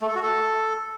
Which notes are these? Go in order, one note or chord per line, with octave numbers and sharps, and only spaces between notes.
A3
A4
F#4
A4